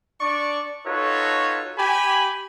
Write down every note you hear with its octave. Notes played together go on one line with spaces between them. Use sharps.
D4 D5 C#6
D#4 F4 F#4 A4 B4 C#5
G4 G#5 B5